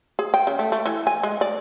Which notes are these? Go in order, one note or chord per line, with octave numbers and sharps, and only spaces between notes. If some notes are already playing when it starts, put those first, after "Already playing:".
G#4
G5
C#3
A3
A3
E3
G#5
G#3
D5